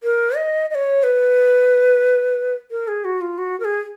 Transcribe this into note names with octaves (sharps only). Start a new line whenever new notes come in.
A#4
D#5
D#5
C#5
B4
A#4
G#4
F#4
F4
F#4
A#4
G#4